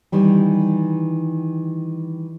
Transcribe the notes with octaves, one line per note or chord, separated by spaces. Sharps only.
D#3 E3 G3